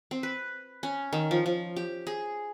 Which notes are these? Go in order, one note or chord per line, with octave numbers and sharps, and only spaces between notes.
C4
B4
C#4
D#3
F3
F3
G4
G#4